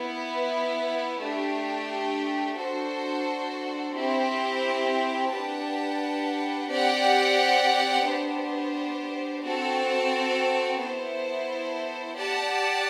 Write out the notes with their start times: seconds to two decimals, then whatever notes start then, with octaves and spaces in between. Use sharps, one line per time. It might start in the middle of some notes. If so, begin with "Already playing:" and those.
Already playing: B3 E4 B4
1.20 A3 D4 G4
2.57 D4 F#4 A4 C5
3.93 C4 E4 G4
5.30 D4 G4 B4 F#5 A5
6.68 C4 G4 D5 F#5
8.05 B3 D4 G4 C5
9.42 C4 F#4 A4
10.79 B3 E4 A4 C5
12.16 G4 D5 F#5 A5